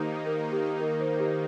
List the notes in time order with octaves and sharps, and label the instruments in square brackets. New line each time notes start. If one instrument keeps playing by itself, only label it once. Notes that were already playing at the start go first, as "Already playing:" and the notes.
Already playing: [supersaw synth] D#3 A#3 D#4 [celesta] G4 C5 D#5
[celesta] A#4
G4
A#4
C5
G4